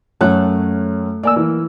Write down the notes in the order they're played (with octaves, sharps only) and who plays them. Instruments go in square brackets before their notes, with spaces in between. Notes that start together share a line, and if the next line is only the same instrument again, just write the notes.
[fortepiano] F#2 C#4 F#6 [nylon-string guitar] A3
[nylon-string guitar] A#3 [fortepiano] D5 G#5 E6
[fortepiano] E3